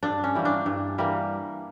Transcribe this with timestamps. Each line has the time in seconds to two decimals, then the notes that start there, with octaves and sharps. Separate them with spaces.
0.03 G2 D4
0.24 C#4
0.35 E3 G3 A#3
0.45 D4
0.66 G2
0.98 E3 G3 A#3